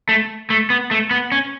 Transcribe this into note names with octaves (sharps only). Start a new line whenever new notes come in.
A3
A3
B3
A3
B3
C#4